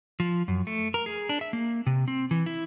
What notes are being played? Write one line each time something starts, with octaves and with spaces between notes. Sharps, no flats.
F3
F#2
A3
A#4
G#4
D4
E5
A#3
C3
C4
E3
E4